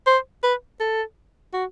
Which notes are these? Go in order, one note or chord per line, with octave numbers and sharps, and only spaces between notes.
C5
B4
A4
F#4